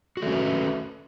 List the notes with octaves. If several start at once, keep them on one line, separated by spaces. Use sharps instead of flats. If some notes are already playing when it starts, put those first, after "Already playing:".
A3 C#4 F#4 B4